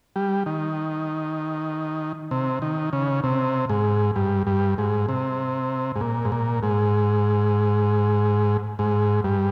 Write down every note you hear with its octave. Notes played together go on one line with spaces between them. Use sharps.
G3
D#3
C3
D#3
C#3
C3
G#2
G2
G2
G#2
C3
G#2
A#2
G#2
A#2
G#2
G#2
G2